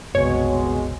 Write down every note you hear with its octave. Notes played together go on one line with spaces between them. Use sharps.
F#1 C2 B2 G#3 C#5